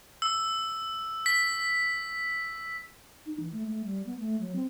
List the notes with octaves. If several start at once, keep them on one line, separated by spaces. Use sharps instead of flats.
E6
B6
D#4
E3
A3
A3
G3
B3
A3
F#3
C4